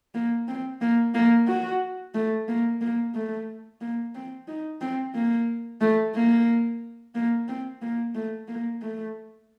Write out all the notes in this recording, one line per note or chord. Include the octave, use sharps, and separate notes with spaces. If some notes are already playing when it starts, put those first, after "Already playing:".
A#3
C4
A#3
A#3
F#4
A3
A#3
A#3
A3
A#3
C4
D#4
C4
A#3
A3
A#3
A#3
C4
A#3
A3
A#3
A3